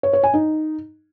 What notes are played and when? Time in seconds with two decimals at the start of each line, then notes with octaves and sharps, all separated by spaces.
0.03 C#5
0.13 C#5
0.23 G#5
0.34 D#4